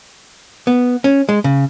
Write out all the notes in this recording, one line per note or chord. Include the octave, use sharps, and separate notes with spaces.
B3
C#4
G#3
C#3